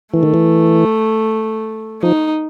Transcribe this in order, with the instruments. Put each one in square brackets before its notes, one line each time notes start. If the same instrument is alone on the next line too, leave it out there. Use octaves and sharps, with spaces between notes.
[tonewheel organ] E3 [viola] A3
[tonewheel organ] D#3
E3
[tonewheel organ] F3 [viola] D#4